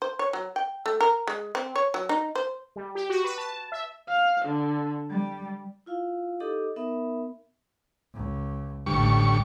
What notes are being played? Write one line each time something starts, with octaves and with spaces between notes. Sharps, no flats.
C5
C#5
F#3
G5
A3
A#4
G#3
C4
C#5
F#3
D#4
C5
G3
G4
F#4
B4
A5
E5
F5
D3
G3
E4 F4 F5
D#4 G4 A4 D#5 D6
B3 D#4 A#4 E5 B5
C#2
A1 D2 A2 G3 C#6